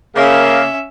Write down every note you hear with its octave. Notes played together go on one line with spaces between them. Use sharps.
C#3 A#3 C#4 E5